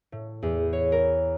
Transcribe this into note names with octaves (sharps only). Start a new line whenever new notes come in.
A2
E2
C#5
A#4